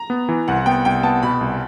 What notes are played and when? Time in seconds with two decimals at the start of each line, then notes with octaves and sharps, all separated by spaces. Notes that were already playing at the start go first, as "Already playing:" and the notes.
Already playing: A#5
0.10 B3
0.29 E3
0.48 C2 F#5
0.66 B3 G5
0.85 C2 G5
1.03 B3 A5
1.22 B2 B5
1.41 C2